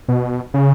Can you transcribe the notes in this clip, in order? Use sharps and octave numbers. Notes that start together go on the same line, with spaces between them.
B2
C#3